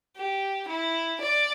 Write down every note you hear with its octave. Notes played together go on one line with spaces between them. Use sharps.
G4
E4
D5